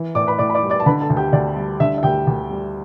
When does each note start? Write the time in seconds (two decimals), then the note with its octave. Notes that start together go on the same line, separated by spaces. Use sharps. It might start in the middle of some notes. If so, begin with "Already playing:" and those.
Already playing: E3
0.15 A2 D5 D6
0.27 B4 B5
0.38 A2 D5 D6
0.50 B5
0.54 D5 D6
0.63 G3
0.70 D5 D6
0.80 A5
0.86 D3 B4 B5
1.01 A4 A5
1.10 D2
1.17 G4 G5
1.33 D2 D5
1.56 G3
1.80 D3 E5
1.98 E5
2.03 D2 G4 G5
2.27 D2
2.50 G3